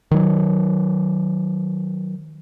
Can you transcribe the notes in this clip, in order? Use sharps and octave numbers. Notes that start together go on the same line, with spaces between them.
D#3 F#3